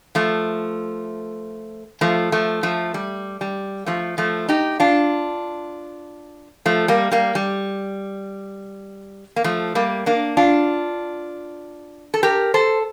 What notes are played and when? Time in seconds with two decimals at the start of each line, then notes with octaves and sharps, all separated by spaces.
0.15 F3 A3
2.01 F3 A3
2.32 F3 A3
2.63 F3 A3
2.94 G3
3.41 G3
3.86 F3 A3
4.18 F3 A3
4.49 D#4 G4
4.80 D4 F4
6.66 F3 A3
6.88 G3 A#3
7.11 G3 A#3
7.35 G3
9.36 A#3
9.44 F3 A3
9.75 G3 A#3
10.06 A#3 D4
10.37 D4 F4
12.14 A4
12.23 G4 A#4
12.54 A4 C5